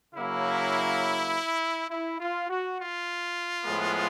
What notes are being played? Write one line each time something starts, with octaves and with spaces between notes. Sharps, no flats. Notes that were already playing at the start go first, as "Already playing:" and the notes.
C#3 F#3 A#3 E4
E4
F4
F#4
F4
A2 F3 G#3 B3